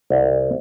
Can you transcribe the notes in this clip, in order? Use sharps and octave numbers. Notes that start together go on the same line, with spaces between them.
C2